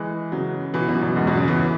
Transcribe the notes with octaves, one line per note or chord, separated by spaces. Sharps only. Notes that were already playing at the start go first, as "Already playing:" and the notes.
Already playing: E3 G#3
C#3 F#3
B2 E3
F#2 B2
F#2 B2
E2 G#2
F#2 B2
G#2 C#3
B2 E3